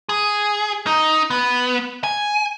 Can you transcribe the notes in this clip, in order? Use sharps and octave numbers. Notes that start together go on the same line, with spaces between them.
G#4
D#4
B3
G#5